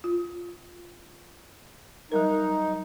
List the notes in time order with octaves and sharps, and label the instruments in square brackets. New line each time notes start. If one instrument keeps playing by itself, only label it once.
[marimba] F4
[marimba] F#3 G3 A#4 [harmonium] D#4